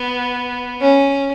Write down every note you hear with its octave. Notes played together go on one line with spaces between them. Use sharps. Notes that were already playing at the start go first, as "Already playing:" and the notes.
Already playing: B3
C#4